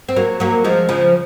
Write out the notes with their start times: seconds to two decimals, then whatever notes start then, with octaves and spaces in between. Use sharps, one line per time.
0.09 C4
0.16 F#3 A#3
0.40 F#3 A#3
0.64 F3 G#3
0.89 C#3 F3